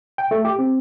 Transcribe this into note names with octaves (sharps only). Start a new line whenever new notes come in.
G5
A3
G4
C4